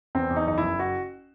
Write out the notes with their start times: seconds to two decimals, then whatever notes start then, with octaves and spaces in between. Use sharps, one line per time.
0.15 E2 C4
0.30 E2
0.36 D#4
0.47 F#1 D#4
0.58 E4
0.63 F#1
0.79 F#4